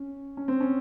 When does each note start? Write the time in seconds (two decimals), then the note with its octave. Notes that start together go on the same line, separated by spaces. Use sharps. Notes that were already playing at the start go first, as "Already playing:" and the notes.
Already playing: C#4
0.37 C#4
0.48 C4
0.61 C#4